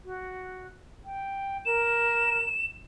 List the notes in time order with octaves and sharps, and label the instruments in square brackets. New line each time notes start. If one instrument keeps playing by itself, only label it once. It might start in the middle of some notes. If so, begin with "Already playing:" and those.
[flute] F#4
G5
[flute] A#4 [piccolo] E7